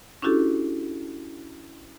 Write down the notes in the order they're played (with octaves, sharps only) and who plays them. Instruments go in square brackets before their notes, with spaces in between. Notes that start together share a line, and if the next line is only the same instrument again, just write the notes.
[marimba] C#4 D4 E4 F#4 G4 A4